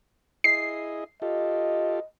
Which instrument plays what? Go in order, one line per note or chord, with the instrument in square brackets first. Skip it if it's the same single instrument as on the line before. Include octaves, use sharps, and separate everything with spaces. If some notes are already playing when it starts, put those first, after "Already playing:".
[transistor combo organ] E4 G#4 D#5 [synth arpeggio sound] C7
[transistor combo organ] F4 G4 A4 [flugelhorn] D#5